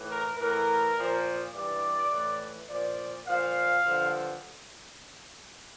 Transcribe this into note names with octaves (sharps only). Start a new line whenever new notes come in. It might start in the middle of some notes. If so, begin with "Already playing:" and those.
Already playing: A2 E3
A#4
A2 E3 A#4
A#2 F3
G2 E3 D5
A2 E3
A#2 F3 D5
A#2 F3 F5
G2 D3 F3